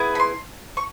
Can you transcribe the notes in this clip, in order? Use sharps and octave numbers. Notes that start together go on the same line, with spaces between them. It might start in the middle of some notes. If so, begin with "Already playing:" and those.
Already playing: B3 E4 G#4
B5
C6
C#6